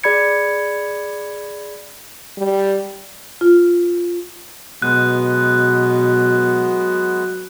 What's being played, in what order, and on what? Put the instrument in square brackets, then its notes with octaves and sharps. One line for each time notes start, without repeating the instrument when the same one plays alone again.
[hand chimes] G#4 D5 B5 G#6 C#7
[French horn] G3
[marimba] F4
[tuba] B2 [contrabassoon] F#3 [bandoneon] G#3 B3 [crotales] F#6